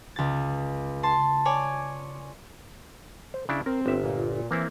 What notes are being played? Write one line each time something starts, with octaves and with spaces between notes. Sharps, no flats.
C#2 A6
A5 C6
C#5 D5 G#5
C5
C#3 D4 E4
C4 A#4
G1 E5
A#2
E3 A#3 C4 E4